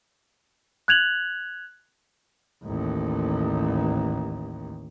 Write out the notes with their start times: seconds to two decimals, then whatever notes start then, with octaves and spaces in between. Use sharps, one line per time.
0.88 F#6 G#6 F7 F#7
2.64 A1 D#2